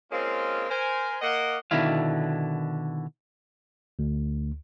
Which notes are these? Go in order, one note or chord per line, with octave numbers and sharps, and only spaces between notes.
G#3 A#3 C4 C#4 F4
A#4 C5 G#5
A#3 D#5 F#5
B2 D3 D#3 E4 F5
D2